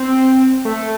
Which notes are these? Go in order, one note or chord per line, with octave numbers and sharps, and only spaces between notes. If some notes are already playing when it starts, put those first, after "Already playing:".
Already playing: C4
A3